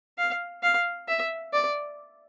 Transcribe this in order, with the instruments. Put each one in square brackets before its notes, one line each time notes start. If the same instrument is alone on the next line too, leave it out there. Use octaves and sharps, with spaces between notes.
[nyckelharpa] F5
F5
E5
D5